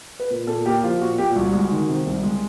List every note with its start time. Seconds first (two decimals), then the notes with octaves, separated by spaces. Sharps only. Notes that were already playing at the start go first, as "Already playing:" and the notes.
0.20 B4
0.30 A#2 A#4
0.47 A#2 A4
0.65 A#3 G4
0.84 F3 F4
1.01 A#2 F#4
1.18 A#2 G4
1.35 C2 F#4
1.53 G#3
1.71 D#3
1.89 C3
2.06 C2
2.23 G#3